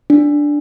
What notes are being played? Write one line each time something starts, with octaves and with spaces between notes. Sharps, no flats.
D4